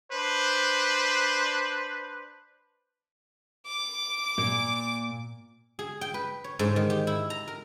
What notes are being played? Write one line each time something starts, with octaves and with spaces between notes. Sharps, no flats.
D4 B4 C5
D6
A#2
G#4
G5
B4
C#5
G#2
D#3
G4
E4
A#5
A#4